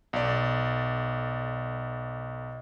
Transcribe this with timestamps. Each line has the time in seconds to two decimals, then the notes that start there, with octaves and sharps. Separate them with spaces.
0.13 B1 D5